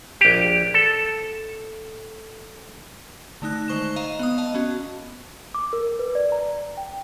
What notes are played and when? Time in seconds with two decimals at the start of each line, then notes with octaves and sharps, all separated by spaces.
0.21 A#1 G4
0.74 A4
3.42 D3 A3 D#4 F#6
3.68 D#3 G#3 C5 C#6 F#6 E7
3.96 D#5 F5 A#5
4.19 B3 F5 D#6
4.38 D#5 F5 A5
4.54 B3 C#4 F#4
5.54 D6
5.73 A#4
5.99 B4
6.15 D5
6.32 A#5
6.77 G5